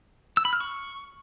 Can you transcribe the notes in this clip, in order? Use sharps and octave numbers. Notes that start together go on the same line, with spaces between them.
E6
B5
F6
C#6